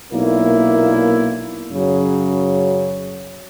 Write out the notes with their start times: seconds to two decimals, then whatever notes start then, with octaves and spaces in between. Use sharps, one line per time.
0.11 B1 A#2 A#3 E4
1.70 F#2 C#3 F#3